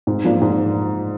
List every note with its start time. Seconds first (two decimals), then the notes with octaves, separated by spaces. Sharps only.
0.07 G#2
0.24 F3 A#3 D4
0.42 G#2